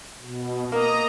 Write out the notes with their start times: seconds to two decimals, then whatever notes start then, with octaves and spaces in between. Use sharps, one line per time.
0.21 B2
0.72 A#3 D#5 A#5